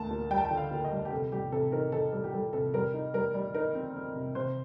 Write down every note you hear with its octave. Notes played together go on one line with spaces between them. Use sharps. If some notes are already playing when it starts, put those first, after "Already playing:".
Already playing: D2 A#3 A5
A#3
G3 G5
A5
G5
D3
F5
A#3
D#5
G3
G4
C3 A4
G3 G4
C3 A4
D#3 A#4
D#3 A4
G3 A4
G4
G3 A4
C3 A4
G3 A#4
D#4
G3 A#4
G3
D#4 A#4
C4
C4
C3
C3 C5